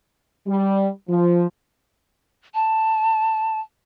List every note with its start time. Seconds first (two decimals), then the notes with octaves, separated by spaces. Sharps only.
0.47 G3
1.09 F3
2.54 A5